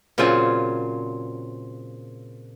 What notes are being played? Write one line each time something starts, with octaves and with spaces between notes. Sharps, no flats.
A#2 C#3 F#3 C4 F4 G#5